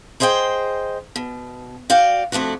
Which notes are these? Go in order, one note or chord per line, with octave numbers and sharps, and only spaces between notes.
G#4 C5 D#5 E5 G5
B2
F#4 D5 F5 G5
F2 A3 D4 F#4